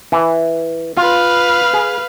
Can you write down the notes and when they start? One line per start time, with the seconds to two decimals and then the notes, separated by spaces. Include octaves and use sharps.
0.12 E3
0.97 F4 B4 F5
1.74 G#4